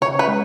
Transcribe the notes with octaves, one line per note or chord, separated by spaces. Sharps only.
C#3 C#5
B4
G#3